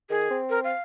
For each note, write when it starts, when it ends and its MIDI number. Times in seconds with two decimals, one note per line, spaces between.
0.10 0.28 51
0.10 0.36 68
0.31 0.72 60
0.50 0.60 70
0.64 0.82 77